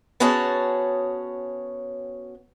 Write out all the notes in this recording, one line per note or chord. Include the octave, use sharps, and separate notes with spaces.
B3 C#4 F#4 G#4 C#5 A5